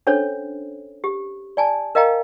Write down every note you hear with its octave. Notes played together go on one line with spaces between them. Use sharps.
C#4 D4 A4 C5 C#5
G4
D5 G#5 A5
A#4 D#5 F5 G5 A#5